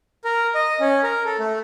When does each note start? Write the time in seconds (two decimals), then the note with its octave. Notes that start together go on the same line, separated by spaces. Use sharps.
0.25 A#4
0.55 D#5
0.81 C#4
1.03 A#4
1.25 A4
1.39 A3